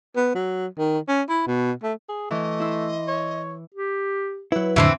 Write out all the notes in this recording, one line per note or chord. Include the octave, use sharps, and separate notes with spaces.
B3
F#3
D#3
C#4
E4
B2
A3
G#4
E3 A3 D#5
E4 C6 E6
C#5
G4
F#3 E4 B4
F2 A2 D3 E3 A3 C4 D4